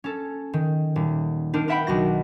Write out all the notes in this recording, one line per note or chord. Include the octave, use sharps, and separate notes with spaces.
C#4 A4
D#3
D#1
C4 D4 D#4 A#4
A#4 B4 E5 F#5 G5 B5
B1 D#3 F#4 A#6